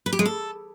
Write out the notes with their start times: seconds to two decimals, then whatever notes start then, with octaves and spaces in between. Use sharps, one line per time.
0.06 B4
0.13 G4
0.19 G#3
0.26 A4